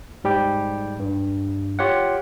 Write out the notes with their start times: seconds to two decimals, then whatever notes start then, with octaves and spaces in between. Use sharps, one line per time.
0.24 G#2 G3 G4 G5
1.00 G2
1.79 F4 G4 C#5 F5 F#5